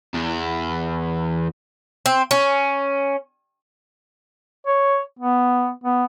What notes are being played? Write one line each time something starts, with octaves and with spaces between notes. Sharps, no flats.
E2
C4
C#4
C#5
B3
B3